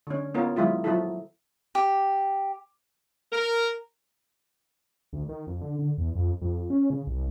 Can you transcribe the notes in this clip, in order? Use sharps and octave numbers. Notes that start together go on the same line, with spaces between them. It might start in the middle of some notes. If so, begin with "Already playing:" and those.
D3 C#4
B3 C#4 D#4 F4 A#4
D#3 F#3 G#3 E4 F4
F3 F#3 D#4 E4 A4
G4
A#4
D2
D#3
F2
D3
D3
E2
F2
F2
C#4
C#3
C2